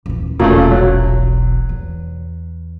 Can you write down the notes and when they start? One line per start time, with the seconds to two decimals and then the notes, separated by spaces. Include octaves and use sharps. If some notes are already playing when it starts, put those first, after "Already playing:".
0.06 D#1 E3
0.40 E1 B1 A#2 C#3 A3
0.71 F#3
1.69 E2